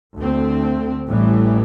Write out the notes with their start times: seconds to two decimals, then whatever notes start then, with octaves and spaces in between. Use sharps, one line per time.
0.17 D2 D3 A3 C4
1.08 A1 A2 E3 G3